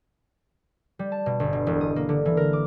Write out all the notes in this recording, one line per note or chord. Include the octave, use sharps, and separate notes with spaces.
G3
A5
B2
G1
B2
E1
D#6
A#3
D3
E3
A#4
D6